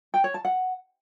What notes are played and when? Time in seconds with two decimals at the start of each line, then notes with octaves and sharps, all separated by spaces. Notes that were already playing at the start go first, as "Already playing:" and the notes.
0.14 G5
0.24 C#5
0.34 A5
0.45 F#5